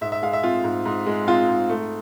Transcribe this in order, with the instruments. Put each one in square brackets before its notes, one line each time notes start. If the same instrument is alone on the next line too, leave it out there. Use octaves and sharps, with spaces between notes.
[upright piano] G#2 E5
E5
G#3 F5
E5
C4 F4
G#2
G#2
G#3
C4 F4
G#2
A3